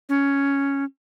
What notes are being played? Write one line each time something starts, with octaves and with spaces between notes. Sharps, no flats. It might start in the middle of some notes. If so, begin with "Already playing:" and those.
C#4